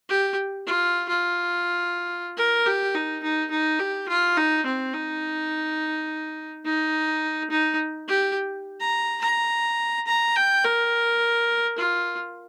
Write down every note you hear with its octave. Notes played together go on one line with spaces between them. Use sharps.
G4
F4
F4
A#4
G4
D#4
D#4
D#4
G4
F4
D#4
C4
D#4
D#4
D#4
G4
A#5
A#5
A#5
G5
A#4
F4